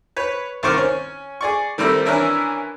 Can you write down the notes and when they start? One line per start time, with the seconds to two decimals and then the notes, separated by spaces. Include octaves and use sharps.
0.16 B4 C#5
0.63 C2 D#3 C5 C#6 D6 F6
0.78 C#4
1.41 G#4 D5 C#6
1.78 D#3 G3 A3 C4 E4
2.06 E3 C#4 D4 E4 A#4